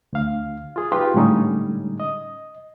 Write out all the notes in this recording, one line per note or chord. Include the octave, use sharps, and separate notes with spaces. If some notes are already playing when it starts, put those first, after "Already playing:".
D2 F5
F4 G#4
D#4 F4 G4 B4 G5
A2 D3 G3 G#3 C#4 D#4
D#5